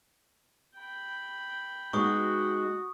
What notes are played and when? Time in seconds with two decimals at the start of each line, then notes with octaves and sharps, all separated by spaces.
0.79 G5 B5
1.93 G#3 B3 D#4 F#4 C#6 D#6